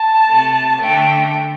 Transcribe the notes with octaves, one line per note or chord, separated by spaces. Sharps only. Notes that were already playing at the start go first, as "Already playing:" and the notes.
Already playing: A5
C3 A3
D3 A3 G5